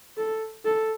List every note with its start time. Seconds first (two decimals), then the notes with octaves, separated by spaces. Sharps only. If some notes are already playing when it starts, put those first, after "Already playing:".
0.17 A4
0.65 A4